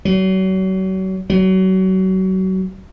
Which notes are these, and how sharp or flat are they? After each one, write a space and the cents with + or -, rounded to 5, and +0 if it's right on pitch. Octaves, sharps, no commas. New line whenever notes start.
F#3 +35
F#3 +30